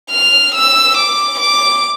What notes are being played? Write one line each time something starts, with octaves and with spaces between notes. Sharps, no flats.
F6
E6
D6
D6